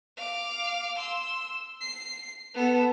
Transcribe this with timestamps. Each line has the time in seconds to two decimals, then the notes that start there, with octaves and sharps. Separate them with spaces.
0.17 F5 D6
0.98 C6 E6
1.81 C7
2.54 B3 A4